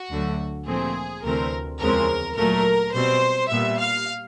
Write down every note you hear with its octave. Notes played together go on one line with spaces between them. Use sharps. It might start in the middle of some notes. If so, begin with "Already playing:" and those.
Already playing: F#4
D2 D3 F#3 A3
A#2 F3 A3 C4 G#4
D2 C3 E3 A3 C4 A#4
E2 C#3 F3 G#3 C4 A#4
A#2 F#3 A3 A#4
B2 G3 C4 C5
A#2 G3 B3 E5
F5